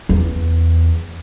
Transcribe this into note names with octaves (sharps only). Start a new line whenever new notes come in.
E2